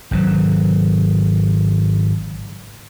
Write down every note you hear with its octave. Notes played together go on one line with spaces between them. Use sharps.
G#1 C#3 F#3